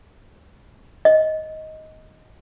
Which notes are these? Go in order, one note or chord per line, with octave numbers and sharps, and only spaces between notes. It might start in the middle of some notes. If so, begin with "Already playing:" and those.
D#5